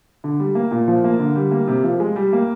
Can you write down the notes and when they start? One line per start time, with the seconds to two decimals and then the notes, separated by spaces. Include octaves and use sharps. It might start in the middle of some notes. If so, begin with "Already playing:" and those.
0.24 D3
0.40 G3
0.55 A#3
0.71 A#2
0.88 F3
1.04 A#3
1.19 D3
1.36 G3
1.51 A#3
1.68 C3
1.84 F3
2.00 G#3
2.16 G3
2.33 A#3